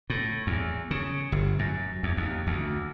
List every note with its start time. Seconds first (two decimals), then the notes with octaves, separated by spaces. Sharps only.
0.10 A2
0.47 E2
0.91 C#3
1.32 G1
1.59 F#2
2.03 E2
2.17 D#2
2.47 D2